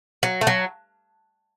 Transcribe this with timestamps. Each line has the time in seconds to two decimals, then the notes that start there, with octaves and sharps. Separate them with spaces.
0.23 F#3
0.41 A3
0.47 F#3